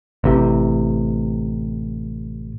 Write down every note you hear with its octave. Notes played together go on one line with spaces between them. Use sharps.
A1 C3